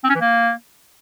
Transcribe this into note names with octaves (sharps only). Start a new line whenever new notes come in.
C4
C#4
E3
A#3